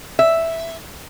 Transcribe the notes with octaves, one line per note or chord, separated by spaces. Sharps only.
E5